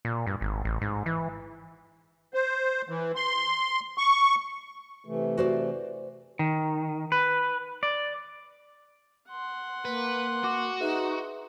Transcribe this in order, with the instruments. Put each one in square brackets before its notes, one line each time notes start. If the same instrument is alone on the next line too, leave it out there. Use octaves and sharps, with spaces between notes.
[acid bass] A#2
G2
G#1
A1
G#2
E3
[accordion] C5
E3
C6
C#6
[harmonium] C3 E3 A3
[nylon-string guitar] F#4 C5 D5
[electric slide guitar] D#3
B4
D5
[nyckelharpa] F#5 C6
[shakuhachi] A#3 [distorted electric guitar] B4
[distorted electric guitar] F#4 [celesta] D6
[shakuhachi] D#4 [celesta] G#4 B4 E5